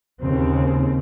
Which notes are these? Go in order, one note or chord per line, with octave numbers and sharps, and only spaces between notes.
D#2 C#3 C4